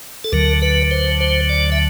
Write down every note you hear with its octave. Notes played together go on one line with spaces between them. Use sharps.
A4
D2 D3 F#3 A#4
B4
C5
C5
D5
E5